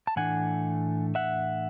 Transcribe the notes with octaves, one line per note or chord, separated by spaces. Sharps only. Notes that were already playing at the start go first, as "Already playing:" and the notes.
A5
A2 E3 A3 D4 F#5 G#5
E5 F#5